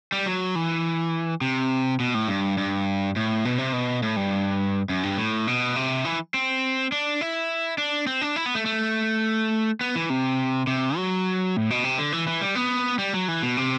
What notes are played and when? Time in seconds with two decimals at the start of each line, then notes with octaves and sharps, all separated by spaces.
0.12 G3
0.26 F#3
0.55 E3
1.41 C3
2.00 B2
2.14 A2
2.28 G2
2.58 G2
3.16 A2
3.45 B2
3.58 C3
3.73 B2
4.03 A2
4.16 G2
4.89 F#2
5.03 G2
5.18 A2
5.47 B2
5.76 C3
6.05 E3
6.34 C4
6.92 D4
7.21 E4
7.78 D4
8.07 C4
8.21 D4
8.36 E4
8.46 B3
8.55 A3
8.66 A3
9.81 B3
9.95 E3
10.10 C3
10.67 C3
10.97 F#3
11.57 A2
11.70 B2
11.84 C3
11.98 D3
12.12 E3
12.27 E3
12.41 G3
12.55 B3
12.99 G3
13.14 F#3
13.28 E3
13.43 B2
13.57 C3